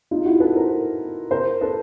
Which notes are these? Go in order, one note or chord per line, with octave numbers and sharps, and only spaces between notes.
D#4 F4
E4 F#4
A4 B4
A#4 C5
A#4 C5
A4 B4